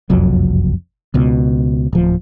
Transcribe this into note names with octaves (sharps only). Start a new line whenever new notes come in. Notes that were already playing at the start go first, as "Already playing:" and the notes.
F#1 C2 F2 F#3
C#2 B2
D1 F3